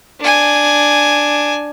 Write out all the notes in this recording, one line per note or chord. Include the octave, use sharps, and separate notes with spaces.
D4 G#5